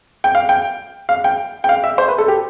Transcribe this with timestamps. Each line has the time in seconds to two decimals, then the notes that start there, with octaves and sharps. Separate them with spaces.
0.24 G5
0.35 F5
0.49 G5
1.09 F5
1.24 G5
1.64 G5
1.69 F5
1.84 E5
1.98 C5
2.08 B4
2.18 A4
2.28 G4